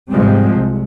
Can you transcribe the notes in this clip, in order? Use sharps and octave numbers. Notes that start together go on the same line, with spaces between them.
G#2 C3 F3 G3 G#3 C4
C2 C3